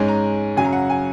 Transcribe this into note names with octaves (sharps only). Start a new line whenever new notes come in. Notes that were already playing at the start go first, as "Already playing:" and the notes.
Already playing: G#2 G#3 C#4 G#5
A#5
F#2 C#3 F#3 G#5
A#5
F#5
G#5